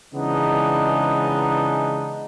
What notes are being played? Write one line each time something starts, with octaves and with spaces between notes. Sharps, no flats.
C#3 E3 G#3 B3 D4 D#4